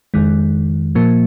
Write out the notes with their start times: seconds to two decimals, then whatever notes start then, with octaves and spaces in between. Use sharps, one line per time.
0.14 F2 D#3 G#3
0.95 A#2 F3 A#3